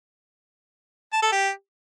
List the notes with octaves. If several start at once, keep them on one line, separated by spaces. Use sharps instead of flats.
A5
A4
G4